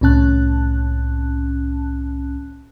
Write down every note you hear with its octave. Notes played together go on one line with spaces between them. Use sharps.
C2 A2 C#4 A5 F#6